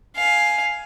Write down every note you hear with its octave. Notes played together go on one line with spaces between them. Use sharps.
F5 G#5